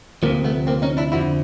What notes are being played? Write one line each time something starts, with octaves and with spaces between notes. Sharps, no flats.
D2 C3 F3 A#3
A3 B3
A#3 C4
C#4 D#4
D4 E4
F2 D3 F3 E4 F#4